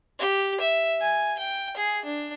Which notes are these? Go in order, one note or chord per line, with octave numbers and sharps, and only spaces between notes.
G4
E5
G#5
G5
G#4
D4